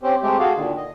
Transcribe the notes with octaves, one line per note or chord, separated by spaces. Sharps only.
C4 C#4 G4 C5
G#3 A3 C4 G4
F#4 G#4 A4 F5
A#2 D3 D#3
D#5